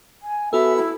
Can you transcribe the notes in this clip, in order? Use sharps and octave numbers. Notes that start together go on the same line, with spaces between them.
G#5
B3 F#4 A4 E5 E6
E4